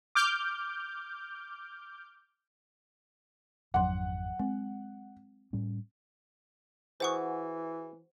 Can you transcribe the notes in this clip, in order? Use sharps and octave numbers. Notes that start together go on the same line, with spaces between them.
D6 F6 G6
G#1 F2 F#3 D4 F#5 C6
G#3 C4
A2 G3 C#4
E3 F#4 G#4 C5 F#5 C#6